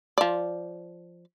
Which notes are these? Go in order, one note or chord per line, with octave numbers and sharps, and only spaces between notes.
F3 D5